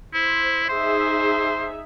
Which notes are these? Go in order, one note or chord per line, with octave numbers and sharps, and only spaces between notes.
E4 C5
D#4 G#4 C5 E5